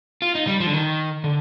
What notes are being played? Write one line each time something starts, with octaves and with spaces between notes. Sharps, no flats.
F4
D#4
G3
F3
D3
D#3
D3